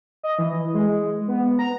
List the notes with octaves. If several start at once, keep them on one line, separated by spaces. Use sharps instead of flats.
D#5
E3
G#3
B3
A#5